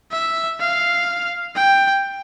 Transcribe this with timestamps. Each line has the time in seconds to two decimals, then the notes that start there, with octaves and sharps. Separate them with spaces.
0.12 E5
0.60 F5
1.55 G5